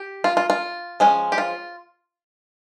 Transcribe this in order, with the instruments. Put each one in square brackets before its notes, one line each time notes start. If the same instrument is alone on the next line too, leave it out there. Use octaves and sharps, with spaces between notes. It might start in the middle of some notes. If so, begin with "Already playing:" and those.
Already playing: [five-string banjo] G4
F4
F4
F4
F3 G#3 C#4
G4
F4